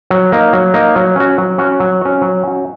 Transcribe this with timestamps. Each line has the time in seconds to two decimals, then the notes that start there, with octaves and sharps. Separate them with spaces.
0.10 F#3
0.32 A#3 D#4
0.53 F#3
0.74 A#3 D#4
0.96 F#3
1.16 C#4 F#4
1.38 F#3
1.58 C#4 F#4
1.80 F#3
2.01 C#4 F#4
2.22 F#3
2.44 C#4 F#4